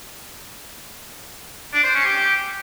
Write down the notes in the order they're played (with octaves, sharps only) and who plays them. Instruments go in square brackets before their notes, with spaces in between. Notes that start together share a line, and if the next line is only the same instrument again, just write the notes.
[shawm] D4
C5
C#4
G4
G4